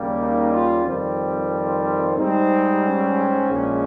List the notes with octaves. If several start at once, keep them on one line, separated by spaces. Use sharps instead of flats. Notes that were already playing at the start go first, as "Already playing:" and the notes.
Already playing: D#2 C#3 G3 A#3
D#4
F4
F2 D#3 G3 C4
G#2 G3 C4 D#4
C#4
A#1 A#2 G#3